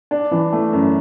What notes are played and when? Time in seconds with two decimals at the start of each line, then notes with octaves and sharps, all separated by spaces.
0.11 D4
0.31 E3
0.53 A3
0.73 F#2